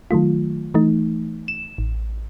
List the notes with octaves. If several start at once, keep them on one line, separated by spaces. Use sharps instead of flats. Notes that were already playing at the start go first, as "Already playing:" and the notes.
D#3 F#3 A3 F4
E3 A3 D#4
E7
A1